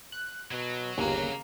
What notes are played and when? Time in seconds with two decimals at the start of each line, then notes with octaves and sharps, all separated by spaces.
0.12 F#6
0.52 B2 F#3 F#4
0.98 G1 D#2 C#3 A#3